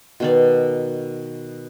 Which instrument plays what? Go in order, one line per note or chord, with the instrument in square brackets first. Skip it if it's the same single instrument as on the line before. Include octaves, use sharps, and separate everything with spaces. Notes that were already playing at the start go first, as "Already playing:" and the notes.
[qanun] B2 D#3 D5